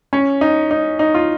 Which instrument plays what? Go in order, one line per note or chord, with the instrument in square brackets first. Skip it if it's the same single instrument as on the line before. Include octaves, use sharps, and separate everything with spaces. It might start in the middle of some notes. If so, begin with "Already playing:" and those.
[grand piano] C#4
D#4
D#4
D#4
F4